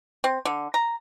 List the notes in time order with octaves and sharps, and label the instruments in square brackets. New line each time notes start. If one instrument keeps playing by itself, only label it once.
[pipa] C4
D3
A#5